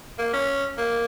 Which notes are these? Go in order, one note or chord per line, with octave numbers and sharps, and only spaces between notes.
A#3
C#4
A#3